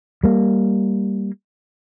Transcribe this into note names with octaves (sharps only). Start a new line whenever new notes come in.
G3 A#3